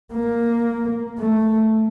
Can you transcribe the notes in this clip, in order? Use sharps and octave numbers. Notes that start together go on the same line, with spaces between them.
A#3
A3